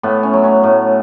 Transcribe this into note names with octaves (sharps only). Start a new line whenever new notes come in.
A2 B3
C#4
F#3
C#4
A2